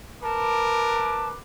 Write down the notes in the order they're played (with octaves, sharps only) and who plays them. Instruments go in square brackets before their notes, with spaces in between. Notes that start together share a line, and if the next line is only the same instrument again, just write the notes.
[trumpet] A#4 [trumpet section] B4 D6 [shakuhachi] A5